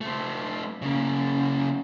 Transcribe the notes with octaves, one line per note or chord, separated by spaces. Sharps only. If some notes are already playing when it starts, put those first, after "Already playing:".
A3 C4
C#3 A#3